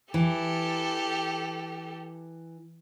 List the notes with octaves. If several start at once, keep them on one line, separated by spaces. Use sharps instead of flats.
E3 G4 A4